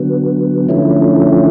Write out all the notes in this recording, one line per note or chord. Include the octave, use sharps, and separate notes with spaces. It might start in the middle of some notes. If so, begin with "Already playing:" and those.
Already playing: D3 F#3 B3
D3 F3 A3 C#4 E4